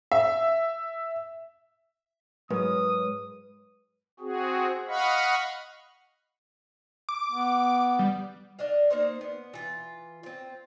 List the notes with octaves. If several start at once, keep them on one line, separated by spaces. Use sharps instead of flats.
E5
G#2 F#3 A#4 B4 C#5 D#6
C4 F#4 G#4
D#5 F5 F#5 B5 C#6
D6
B3
G3
D4 D#5 F5
A#3 D#4 C5 D5
B3
E3 F4
C4 F4